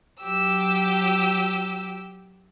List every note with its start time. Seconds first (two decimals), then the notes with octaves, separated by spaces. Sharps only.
0.19 F#3 G4 E6